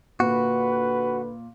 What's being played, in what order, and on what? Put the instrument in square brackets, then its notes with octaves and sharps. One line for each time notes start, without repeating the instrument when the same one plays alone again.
[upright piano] A#2 [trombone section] D3 B4 [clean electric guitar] F#4